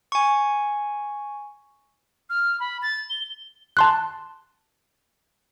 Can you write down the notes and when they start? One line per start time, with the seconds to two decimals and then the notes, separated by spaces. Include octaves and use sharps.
0.12 G#5 C#6
2.30 F6
2.60 B5
2.82 A6
3.10 G7
3.77 A5 C6 F#6